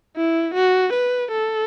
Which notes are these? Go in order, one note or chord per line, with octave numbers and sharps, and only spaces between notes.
E4
F#4
B4
A4